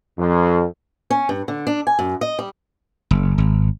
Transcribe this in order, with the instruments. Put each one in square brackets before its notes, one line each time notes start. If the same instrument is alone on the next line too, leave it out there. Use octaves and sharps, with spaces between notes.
[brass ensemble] F2
[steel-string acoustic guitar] C#4
G2
D3
D4
G#5
F#2
D#5
G3
[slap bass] F#1
G#1